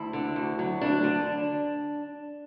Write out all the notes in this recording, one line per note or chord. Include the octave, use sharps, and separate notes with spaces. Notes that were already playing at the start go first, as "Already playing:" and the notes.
Already playing: D2 E4
D3
D2
F#3
D2 D4
D3